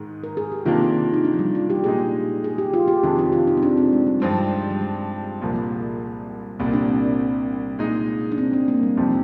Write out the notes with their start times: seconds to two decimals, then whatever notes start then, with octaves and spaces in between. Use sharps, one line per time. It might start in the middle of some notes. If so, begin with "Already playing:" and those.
Already playing: G#2 D#3 G#3
0.24 A#4
0.37 G#4
0.52 G4
0.65 C3 D#3 A#3 D4 F4
1.14 D#4
1.25 D4
1.34 F3
1.39 G3
1.55 F4
1.70 G4
1.84 A#2 G#3 D#4 G#4
2.44 G#4
2.58 G4
2.74 F4
2.88 G4
3.03 F2 C3 D#3 G#3 D4 G#4
3.19 G4
3.32 F4
3.47 D#4
3.57 C4
3.63 D4
3.77 C4
3.93 G#3
4.07 G3
4.20 G2 F3 G#3 C4
4.32 G3
4.71 G3
4.81 G#3
5.41 C2 A#2 F3 G#3
6.59 C2 A#2 G3 C4
6.73 D4
6.88 C4
7.79 A#2 G#3 D#4
8.32 D4
8.38 C4
8.53 D4
8.68 A#3
8.78 G#3
8.83 G3
8.97 F2 C3 F3 C4 D#4